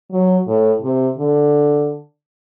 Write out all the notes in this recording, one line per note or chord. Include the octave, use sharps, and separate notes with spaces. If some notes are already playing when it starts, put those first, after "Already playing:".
F#3
A2
C3
D3